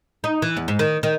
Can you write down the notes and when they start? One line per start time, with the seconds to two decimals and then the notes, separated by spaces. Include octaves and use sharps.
0.24 D#4
0.42 E3
0.57 E2
0.68 G#2
0.79 D#3
1.03 D#3